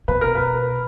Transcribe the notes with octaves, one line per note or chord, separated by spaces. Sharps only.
B2 B4
A#4
B4